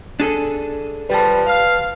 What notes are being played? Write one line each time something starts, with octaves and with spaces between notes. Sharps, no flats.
D4 G#4 A4
F3 G3 B4 A5
F5